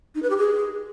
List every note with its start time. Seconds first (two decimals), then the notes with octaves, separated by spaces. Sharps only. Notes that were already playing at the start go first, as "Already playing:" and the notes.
0.15 D#4
0.23 B4
0.30 G4
0.38 G#4